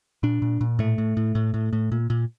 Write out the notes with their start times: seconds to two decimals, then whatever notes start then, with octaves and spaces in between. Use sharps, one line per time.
0.23 A#2 D4
0.42 A#2
0.61 A#2
0.79 A2 A3
0.98 A2
1.17 A2
1.35 A2
1.54 A2
1.73 A2
1.92 A#2
2.10 A#2